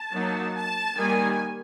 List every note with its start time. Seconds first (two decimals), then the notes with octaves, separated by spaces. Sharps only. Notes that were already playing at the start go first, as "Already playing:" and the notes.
Already playing: A5
0.13 F#3 A#3 D#4
0.56 A5
0.98 D#3 G3 A#3 G#5